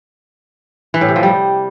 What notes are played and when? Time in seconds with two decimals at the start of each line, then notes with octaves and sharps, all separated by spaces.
0.94 E3
1.01 A2
1.08 C3
1.16 F3
1.23 G3